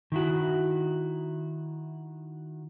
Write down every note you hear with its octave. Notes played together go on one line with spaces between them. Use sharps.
D#3 E4 F#4